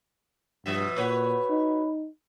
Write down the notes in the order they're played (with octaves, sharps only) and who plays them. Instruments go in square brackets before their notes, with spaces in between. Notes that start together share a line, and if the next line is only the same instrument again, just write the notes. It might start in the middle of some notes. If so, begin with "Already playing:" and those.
[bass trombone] G2 [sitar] B2 F3 E5
[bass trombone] A#2 [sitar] F#4 B4 C#5
[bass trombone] D#4